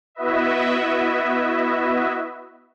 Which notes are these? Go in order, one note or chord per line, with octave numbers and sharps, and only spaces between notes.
B3 E4 F#4 B4 D#5 E5